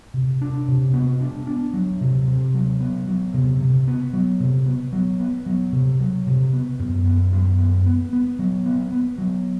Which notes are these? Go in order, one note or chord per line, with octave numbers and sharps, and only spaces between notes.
C3
D4
C3
B3
D4
D4
F#3
C3
C3
F#3
B3
F#3
C3
C3
B3
F#3
C3
B3
F#3
B3
F#3
C3
F#3
C3
B3
F#2
B3
F#2
B3
B3
B3
F#3
B3
B3
F#3